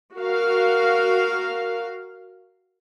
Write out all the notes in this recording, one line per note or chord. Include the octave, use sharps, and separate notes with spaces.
F#4 A#4 F5